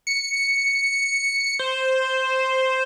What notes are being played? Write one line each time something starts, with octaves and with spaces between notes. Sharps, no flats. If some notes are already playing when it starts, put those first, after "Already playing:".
C#7
C5